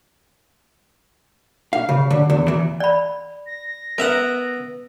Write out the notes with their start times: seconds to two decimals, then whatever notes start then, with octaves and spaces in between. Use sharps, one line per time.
1.73 F5
1.89 C#3
2.10 D3
2.30 E2
2.48 E3
2.80 D5 B5
3.47 A#6
3.98 B3 A#4 E5 F#5